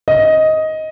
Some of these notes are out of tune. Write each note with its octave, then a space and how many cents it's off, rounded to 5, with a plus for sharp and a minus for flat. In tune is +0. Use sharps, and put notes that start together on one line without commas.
D#5 +10